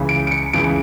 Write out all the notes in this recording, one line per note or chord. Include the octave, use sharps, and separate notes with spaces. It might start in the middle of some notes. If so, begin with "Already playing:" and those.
Already playing: C#2 C#3 E3
D7
D7
C#7
C#2 C#3 E3 D7